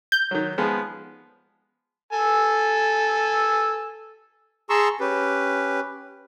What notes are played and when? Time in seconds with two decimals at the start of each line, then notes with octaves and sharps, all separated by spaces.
0.12 G6
0.31 D#3 F#3
0.58 F3 G#3 B3
2.13 A4 G#5 E6
4.70 G#4 A5 A#5 C6 C#6 E6
5.00 C#4 G4 B4